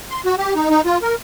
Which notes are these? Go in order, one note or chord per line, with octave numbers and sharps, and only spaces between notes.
C6
F#4
G4
D#4
D#4
F4
A#4